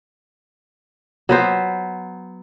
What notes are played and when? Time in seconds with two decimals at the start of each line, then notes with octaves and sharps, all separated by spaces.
1.29 F#3 B3 C5